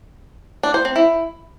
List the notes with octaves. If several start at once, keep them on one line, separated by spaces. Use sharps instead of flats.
D4
C5
C4
E4